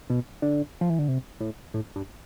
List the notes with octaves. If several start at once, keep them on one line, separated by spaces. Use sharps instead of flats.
B2
D3
F3
E3
D3
C3
A2
A2
G2